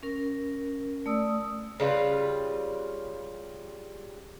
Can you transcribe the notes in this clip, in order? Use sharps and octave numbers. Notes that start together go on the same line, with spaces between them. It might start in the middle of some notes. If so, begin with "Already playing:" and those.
C#4 A#4
A3 D5 D#6 E6
C#3 G3 F4 B4